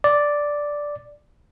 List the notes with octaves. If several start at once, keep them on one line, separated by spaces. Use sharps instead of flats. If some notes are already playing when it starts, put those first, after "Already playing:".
D5